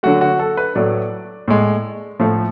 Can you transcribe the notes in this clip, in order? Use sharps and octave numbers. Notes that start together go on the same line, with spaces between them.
D3 F#3 A3 F#4
F#4
A4
B4
A2 F#3 A3 D5
A2 G#3
A2 F3 A3